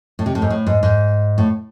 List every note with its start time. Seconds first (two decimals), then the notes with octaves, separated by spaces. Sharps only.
0.19 A2
0.26 C3
0.35 A2
0.42 G#2
0.50 A2
0.66 G#2
0.83 G#2
1.38 A2